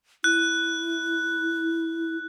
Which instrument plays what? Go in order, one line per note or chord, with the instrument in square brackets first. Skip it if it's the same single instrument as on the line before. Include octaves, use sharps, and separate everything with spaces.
[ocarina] E4 [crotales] F#6